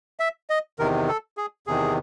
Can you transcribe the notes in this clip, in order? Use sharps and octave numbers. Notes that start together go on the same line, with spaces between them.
E5
D#5
E2 C3 D#3 A#4
A4
G#4
E2 C3 D#3 G#4